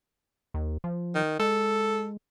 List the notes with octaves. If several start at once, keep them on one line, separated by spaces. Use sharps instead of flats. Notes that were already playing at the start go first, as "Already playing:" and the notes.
D#2
F3
D#3
G#3 A4